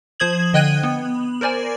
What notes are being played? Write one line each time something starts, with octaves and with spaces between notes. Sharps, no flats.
F3 C5 D#6 G#6 F#7
D3 D#5 G5 F#6 G#6 D#7
B3
A#4 C5 D5 G#5